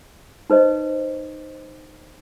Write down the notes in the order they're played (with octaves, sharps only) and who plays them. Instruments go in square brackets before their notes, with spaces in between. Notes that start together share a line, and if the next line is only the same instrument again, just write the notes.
[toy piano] D#4 B4 C5 D#5